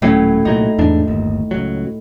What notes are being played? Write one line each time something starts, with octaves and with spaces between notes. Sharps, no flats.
D#1 A2 F#3 C#4
C2 A#2 F#3 D#4
E2 G#2 D4
G1 D#2
C#2 F#3